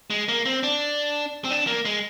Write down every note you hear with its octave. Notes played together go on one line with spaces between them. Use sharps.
G#3
A#3
C4
D4
C4
D4
A#3
G#3